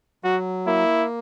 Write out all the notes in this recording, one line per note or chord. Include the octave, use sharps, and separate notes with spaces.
F#3 F#4
A#3 E4